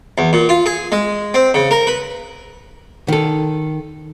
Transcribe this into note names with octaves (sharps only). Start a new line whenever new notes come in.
E2
A#2
F4
G#4
G#3
C4
C#3
A#4
B4
D#3 A4